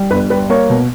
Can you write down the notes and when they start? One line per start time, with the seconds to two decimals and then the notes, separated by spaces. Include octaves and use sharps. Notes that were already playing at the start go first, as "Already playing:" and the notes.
Already playing: G3
0.10 G1 B4
0.30 G3 B4
0.50 A#3 C#5
0.70 B2